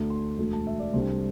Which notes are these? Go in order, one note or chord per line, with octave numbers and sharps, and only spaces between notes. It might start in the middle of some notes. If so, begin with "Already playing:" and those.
Already playing: D2 D3 A3
C6
E1 D2 D3 A3
A5
E5
D5
C2 C3 A3 D4 C5